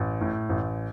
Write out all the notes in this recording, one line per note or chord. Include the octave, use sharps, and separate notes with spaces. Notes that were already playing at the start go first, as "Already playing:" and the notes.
Already playing: A1
A2
A1